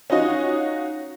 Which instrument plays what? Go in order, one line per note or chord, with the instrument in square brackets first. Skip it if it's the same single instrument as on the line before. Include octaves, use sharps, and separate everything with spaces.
[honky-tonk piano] C#4 D#4 F4 F#4 D#5